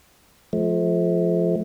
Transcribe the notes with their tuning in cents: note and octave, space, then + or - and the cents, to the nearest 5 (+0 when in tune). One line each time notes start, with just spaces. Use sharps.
F3 +0 A3 -35